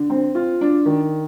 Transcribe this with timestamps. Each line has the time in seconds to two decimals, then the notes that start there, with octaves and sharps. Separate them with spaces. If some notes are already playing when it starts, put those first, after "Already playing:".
Already playing: D3
0.10 C4
0.35 F4
0.61 D4
0.86 D#3